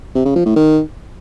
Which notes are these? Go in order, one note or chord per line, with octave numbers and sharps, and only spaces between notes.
C3
C#3
F3
A2
D#3